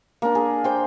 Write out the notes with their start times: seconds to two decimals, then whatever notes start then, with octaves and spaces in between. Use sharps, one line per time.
0.22 A#3 D4
0.35 G#4
0.64 C5 G5